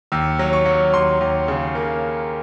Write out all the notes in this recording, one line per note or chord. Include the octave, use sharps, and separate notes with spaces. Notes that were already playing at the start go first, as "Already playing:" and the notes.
D#2 E6
F#3
C#6
F#3
D#2 C6
D#2
C#3
A#3